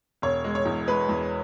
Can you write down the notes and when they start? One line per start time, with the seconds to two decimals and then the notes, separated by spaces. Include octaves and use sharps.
0.22 E1 C#5
0.44 G#3
0.55 C#5
0.65 E2
0.87 G#3 B4
1.09 E2